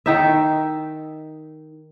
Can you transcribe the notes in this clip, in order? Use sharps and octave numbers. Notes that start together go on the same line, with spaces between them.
D#3 D#4 E5